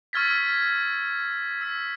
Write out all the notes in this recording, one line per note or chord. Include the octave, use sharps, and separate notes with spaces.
C#6 E6 F6 G#6 A6 B6
E6 B6